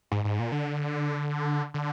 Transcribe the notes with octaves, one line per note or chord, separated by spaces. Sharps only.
G#2
G#2
A#2
D3
D3